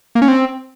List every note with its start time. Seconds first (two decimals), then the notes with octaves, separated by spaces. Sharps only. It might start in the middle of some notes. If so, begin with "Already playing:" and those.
0.15 A#3
0.22 C#4
0.28 C4